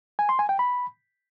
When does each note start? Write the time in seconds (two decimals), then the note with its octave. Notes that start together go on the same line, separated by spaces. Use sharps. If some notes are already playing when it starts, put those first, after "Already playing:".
0.19 G#5
0.29 C6
0.39 G#5
0.49 G5
0.59 B5